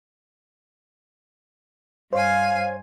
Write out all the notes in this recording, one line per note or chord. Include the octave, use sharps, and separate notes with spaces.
G2 C5 C#5 F5 G#5